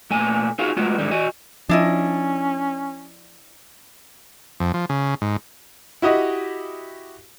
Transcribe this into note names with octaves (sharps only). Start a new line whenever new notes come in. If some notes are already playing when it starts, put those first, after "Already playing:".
A#2 A3 G#5
D#4 F4 F#4 G#4 F5
G#3 A3 B3 F4 F#4
G#2 D3 D#3 G3
F#4 D#5 G#5
F3 C#4 D4 E4 D#5
F2
F3
C#3
G#2
E4 F#4 G4 D#5